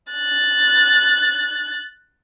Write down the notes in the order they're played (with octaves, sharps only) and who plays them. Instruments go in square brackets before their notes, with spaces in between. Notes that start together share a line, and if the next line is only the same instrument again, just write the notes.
[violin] F#6 A6